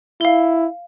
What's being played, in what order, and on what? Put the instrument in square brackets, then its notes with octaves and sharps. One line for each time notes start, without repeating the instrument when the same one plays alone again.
[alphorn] E4 [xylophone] F5 G7